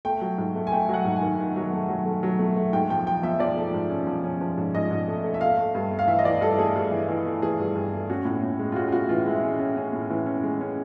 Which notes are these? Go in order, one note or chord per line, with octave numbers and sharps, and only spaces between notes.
A3 G5
F#3
G#2
A3
G#5
A3 G5
F#3 F#5
G#2
G#5
D#3
D#3
F#3
A3
F#3
A3
F#3
A3
A3
G#2 G5
F3 G5
F3 G5
F3 E5
F3 D5
A3
G#2
C#4
F3
C#4
F3
G#2
G#2 D#5
G#2
A3
A3
E5
A3 F5
A3
G2
A3
F5
E3 E5
D#5
E3 D5
G2 A4
A3 G#4
G2
E3
E3
A3
E3 G#4
G2
G2
A3
C#4 F#4
A2
A2
G#3
F4
C#4 F#4
F4
A2 F#4
E3 F4
G#3 E4
C#4
C#4
C#4
A2
E3
C#4
G#3
C#4